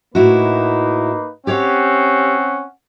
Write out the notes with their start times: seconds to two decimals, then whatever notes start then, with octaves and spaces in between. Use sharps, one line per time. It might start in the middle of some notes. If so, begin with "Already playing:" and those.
0.15 A2 A#3 D#4 E4 F#4 B4
1.47 C4 C#4 G4 C#5 F5 F#5